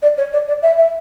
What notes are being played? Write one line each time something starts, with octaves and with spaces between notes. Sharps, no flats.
D5
C#5
D5
D5
E5
E5